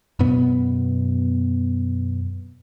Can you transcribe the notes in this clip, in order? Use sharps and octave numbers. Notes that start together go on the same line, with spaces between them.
F#2 B2 B3